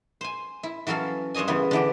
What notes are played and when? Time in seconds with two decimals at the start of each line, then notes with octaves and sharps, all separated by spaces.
0.21 C5 G#5
0.63 E4
0.87 E3 F#3 C#4 A4 F5
1.34 G2 C5 C#5 D#5 G#5
1.48 C#3 E3 B3 C#5
1.71 D3 E3 G4